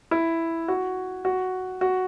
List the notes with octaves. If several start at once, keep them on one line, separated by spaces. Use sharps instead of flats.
E4
F#4
F#4
F#4